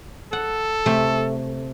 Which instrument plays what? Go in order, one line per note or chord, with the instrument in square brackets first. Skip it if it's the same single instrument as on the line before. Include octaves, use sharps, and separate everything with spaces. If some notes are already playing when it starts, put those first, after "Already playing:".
[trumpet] A4 [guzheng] F#5
[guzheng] C3 A3